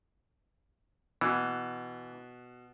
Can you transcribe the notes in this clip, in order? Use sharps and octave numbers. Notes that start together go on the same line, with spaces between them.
B2 E3 F#6